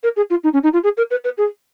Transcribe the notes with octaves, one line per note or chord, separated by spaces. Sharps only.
A#4
G#4
F4
D#4
C#4
D#4
F4
G#4
A#4
B4
B4
G#4